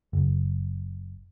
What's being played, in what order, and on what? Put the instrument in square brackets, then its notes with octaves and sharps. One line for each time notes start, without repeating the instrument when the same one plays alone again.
[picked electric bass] F#1